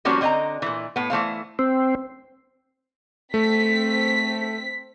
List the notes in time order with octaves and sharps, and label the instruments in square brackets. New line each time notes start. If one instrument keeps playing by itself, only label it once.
[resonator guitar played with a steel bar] F3 G3 A#3 C#4 F#4 B4
D3 C4 D#5 G5 A#5
A#2 E3
A2 B3
E3 A3 C5 F5
[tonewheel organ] C4
[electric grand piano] A3 [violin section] C4 B6